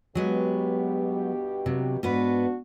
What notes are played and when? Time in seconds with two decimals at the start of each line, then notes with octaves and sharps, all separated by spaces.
0.15 G2 B2 F#3 G#3 B3 G4
1.66 C3 F#3
2.03 G#2 B3 D4 F#4 B4